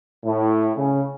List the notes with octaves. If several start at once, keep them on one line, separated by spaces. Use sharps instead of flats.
A2
C#3